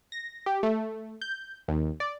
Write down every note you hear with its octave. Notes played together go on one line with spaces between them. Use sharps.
A#6
G4
A3
G6
D#2
D5